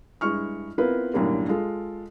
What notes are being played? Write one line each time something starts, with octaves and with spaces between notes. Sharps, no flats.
G2 G#3 E4 C#6 F6
B3 C4 E4 F4 A#4 B4
B1 F#2 A2 D3 G3 A#3
G#3 F4 A4